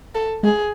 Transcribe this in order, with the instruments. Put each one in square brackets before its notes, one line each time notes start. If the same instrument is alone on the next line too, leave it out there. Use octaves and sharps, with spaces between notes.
[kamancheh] A4
[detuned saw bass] G#3 [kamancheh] G#4